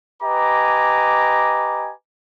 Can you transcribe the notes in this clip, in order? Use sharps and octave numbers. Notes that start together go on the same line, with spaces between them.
G4 B4 D#5 G#5 A#5 D6